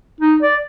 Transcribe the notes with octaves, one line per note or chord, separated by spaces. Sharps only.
D#4
D5